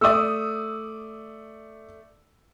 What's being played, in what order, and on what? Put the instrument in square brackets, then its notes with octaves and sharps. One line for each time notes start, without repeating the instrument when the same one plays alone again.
[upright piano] A3 D5 [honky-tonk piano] D#6 E6